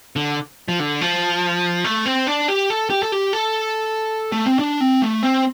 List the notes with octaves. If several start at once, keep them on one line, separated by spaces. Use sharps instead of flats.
D3
F3
D3
F3
A3
C4
D4
G4
A4
G4
A4
G4
A4
A3
C4
D4
C4
A3
C4